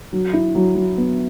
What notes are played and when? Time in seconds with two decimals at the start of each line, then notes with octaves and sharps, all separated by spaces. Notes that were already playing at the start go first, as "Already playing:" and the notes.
0.13 F#3
0.33 E4
0.55 F#3
0.75 F#3
0.97 B3